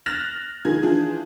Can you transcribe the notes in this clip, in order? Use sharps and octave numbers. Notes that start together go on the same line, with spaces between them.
F6 F#6 A6 A#6 E7
D#3 F3 G#4 G#6
E3 F3 D4 G#4